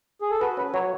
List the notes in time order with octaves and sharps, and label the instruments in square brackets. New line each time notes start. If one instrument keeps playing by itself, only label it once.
[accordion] G#4
A4
[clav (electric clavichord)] F#4 [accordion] B4
[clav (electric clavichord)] C#4 [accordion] B4
[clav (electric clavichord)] F#3 [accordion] C#5